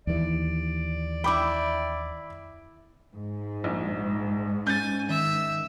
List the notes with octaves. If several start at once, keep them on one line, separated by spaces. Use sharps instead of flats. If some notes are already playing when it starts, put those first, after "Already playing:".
D#2 E3 D5
E4 G5 B5 D6
G#2
A#1
C#4 G#5 G6 A6
D#3 E5